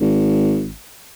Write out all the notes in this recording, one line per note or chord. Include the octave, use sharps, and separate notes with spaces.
G#1